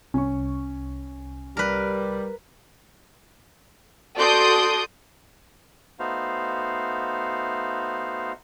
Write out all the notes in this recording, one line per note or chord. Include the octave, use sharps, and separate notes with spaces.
C2 C#4 C#6
G3 A#4 B4
F#4 A4 D5 C6 D#6 G6
A3 B3 D#4 F#4 C5 F5